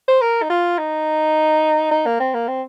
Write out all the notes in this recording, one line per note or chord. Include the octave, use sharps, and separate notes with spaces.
C5
A#4
D#4
F4
D#4
D#4
A#3
C4
A#3
C4